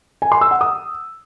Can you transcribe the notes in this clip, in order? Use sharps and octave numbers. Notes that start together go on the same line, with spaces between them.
G#5
C6
E6
F#5
D#6